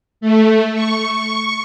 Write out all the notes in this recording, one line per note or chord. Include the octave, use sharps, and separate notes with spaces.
A3
C#6